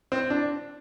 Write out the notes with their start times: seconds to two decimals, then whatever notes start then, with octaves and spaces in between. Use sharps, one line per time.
0.12 C4
0.30 D4